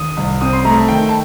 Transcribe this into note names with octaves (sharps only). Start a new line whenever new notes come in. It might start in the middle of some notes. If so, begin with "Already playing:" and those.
Already playing: D#2 D#6
C2
C4 D#6
C6
A3 A#5
A5
D#3 G5
A5